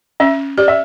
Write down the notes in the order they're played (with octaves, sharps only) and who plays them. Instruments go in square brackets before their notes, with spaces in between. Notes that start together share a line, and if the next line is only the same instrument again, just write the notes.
[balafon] C#4 [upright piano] E5
[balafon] G4 [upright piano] D5
[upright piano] E5